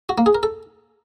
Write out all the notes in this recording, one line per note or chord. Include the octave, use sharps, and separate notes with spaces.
F#4
A#3
G#4
A#4
A4